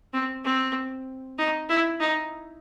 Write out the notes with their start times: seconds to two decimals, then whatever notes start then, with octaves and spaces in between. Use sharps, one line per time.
0.13 C4
0.44 C4
1.38 D#4
1.69 E4
2.00 D#4